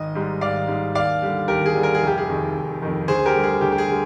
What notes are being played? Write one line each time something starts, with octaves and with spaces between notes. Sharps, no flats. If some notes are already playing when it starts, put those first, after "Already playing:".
Already playing: G#1 D#5
G#2 G3
G#1 D5 F5
G#2 G3
D#2 D5 F5
D3 G3
D#2 G4 A#4
G#4
D3 G3
A#4
G#4
F1
G4
G#4
F2 D#3
F1
F2 D#3
D2 G#4 C5
G4 A#4
D3 G3
G#4
D2 G4
G4
G#4
D3 G3